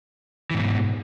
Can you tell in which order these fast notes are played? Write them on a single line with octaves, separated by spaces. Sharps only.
E3 G#2 B2